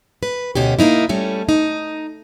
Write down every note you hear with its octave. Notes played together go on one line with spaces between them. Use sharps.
B4
D2 B2 C#4 G4
A#3 C4 D#4 E4
G3 A3 C#4
D#4